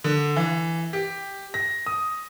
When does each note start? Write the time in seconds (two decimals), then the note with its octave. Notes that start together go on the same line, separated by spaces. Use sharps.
0.04 D3
0.36 E3
0.93 G4
1.54 A#6
1.86 D#6